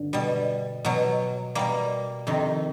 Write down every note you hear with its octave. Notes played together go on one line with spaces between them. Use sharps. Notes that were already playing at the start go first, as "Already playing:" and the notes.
Already playing: G2 D3
B2 G3
B2 F#3
B2 G3 A#3
F2 C3 D#3